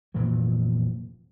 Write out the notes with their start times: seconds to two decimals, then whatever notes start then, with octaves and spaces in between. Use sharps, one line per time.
0.14 F1 A#2 E3 F#3